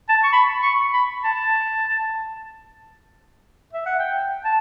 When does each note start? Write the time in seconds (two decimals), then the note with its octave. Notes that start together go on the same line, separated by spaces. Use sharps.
0.09 A5
0.24 C#6
0.33 B5
0.63 C#6
0.93 B5
1.24 A5
3.73 E5
3.86 F#5
3.99 G5
4.45 A5